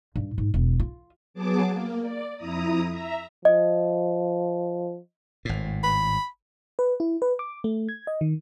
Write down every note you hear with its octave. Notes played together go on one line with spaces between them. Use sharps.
G2
G#2
E1
F4
F#3 B3 G#4 A5 D6
A#3
D5
F2 E4 A#5 D#6
E5 A#5
F3 D#5
G#1 A2
B5
B4
E4
B4
D6
A3
G#6
D#5
D#3